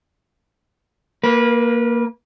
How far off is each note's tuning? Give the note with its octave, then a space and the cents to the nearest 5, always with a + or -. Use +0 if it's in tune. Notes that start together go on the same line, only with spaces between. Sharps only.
A#3 +0 B4 -25